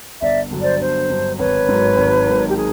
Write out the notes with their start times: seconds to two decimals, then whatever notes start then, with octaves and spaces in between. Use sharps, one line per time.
0.21 G1 D5 E5
0.51 G2 D3 F#3
0.61 C5 D5
0.80 G1 C5
1.09 G2 D3 F#3
1.38 G#1 B4 C#5
1.68 G#2 D#3 F#3
1.97 G#1
2.27 G#2 D#3 F#3
2.49 G4
2.56 G#4